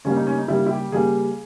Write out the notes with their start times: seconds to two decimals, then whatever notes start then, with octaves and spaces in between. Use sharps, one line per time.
0.05 C#3 G3 A#3 C#4
0.16 D#4
0.27 C#4
0.38 D#4
0.48 C#3 G3 A#3 E4
0.66 E4
0.70 G4
0.91 C#3 G3 A#3 G#4